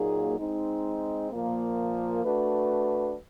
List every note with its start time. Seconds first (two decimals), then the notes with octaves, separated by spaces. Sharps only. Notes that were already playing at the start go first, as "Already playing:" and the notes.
Already playing: A#2 F#3 A#3 D#4 G#4
0.39 G#3 C4 D#4
1.32 A#2 F3 A#3
2.24 A3 D4 F#4 B4